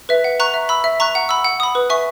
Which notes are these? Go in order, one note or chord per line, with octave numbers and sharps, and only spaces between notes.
B4 E5
F#5
A#5 C#6 F#6
E5
B5 E6
E5
A#5 C#6 F#6
F#5
B5 E6
F#5
B5 D#6
B4
E5 G#5 C#6